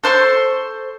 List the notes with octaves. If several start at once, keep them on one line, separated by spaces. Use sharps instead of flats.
A4 C5 C6 C#6